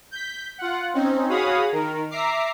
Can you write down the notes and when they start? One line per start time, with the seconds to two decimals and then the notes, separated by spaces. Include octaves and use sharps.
0.11 G6 B6
0.58 F4 F#5
0.94 C4 C#4 D#4
1.29 F#4 G#4 C#5 F5 B5 D#6
1.72 D#3 A#4
2.10 E5 A#5 D6 C7